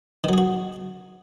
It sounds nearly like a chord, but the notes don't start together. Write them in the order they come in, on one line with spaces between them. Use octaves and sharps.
D#3 F#3 G#4 F#4